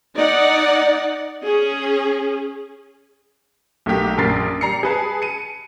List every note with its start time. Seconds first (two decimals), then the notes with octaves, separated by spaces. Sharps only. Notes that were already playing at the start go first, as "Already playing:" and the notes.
0.16 D#4 D5 F#5
1.43 C#4 G#4
3.86 B1 A3 A#3 G4 B6
4.18 A#1 F#2 A#4 A6 C7
4.61 G3 A#5 C7 C#7
4.83 G#4 B4 A5
5.22 C#7 D#7